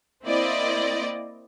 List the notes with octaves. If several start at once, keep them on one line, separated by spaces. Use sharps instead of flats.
A#3 C4 E4 D5 D#5